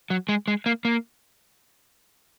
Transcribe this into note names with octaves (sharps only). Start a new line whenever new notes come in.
F#3
G#3
G#3
A#3
A#3